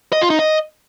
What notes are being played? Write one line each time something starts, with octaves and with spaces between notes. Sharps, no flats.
D#5
F4
D#4
D#5